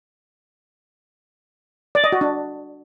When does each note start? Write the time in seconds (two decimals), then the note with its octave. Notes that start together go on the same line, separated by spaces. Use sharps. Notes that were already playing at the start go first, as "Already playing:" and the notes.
1.95 D5
2.04 D#5
2.12 F#4
2.21 D4